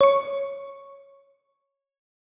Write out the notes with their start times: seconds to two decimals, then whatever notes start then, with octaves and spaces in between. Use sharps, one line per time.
0.01 C#5 C#6